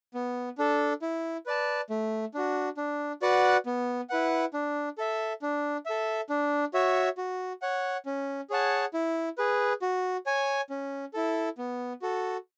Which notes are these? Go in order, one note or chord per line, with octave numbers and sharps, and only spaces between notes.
B3
D4 A4
E4
B4 D5 A5
A3
D4 F#4
D4
F#4 B4 D5 F#5
B3
E4 B4 F#5
D4
A4 E5
D4
A4 E5
D4
F#4 C#5 E5
F#4
C#5 F#5
C#4
G#4 C#5 F#5 A5
E4
G#4 B4
F#4
C#5 G#5
C#4
E4 A4
B3
F#4 A4